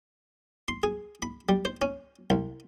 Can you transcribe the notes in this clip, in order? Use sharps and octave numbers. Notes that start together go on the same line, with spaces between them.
C6
G#4
B5
G3
C5
C#4
C2